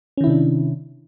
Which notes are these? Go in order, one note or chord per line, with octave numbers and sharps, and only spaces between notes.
C3 D#3 C#4 D4 E4